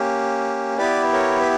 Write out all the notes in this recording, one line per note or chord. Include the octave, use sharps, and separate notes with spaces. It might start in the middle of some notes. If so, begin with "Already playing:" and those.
Already playing: A#3 C#4 G4
B3 E4 G4 B4 D5
A#4 C#5
B4